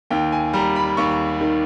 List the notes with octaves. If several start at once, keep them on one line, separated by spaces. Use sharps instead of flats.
D#2 G5
G#5
G3 A#5
B5
D#2 C#6
D#3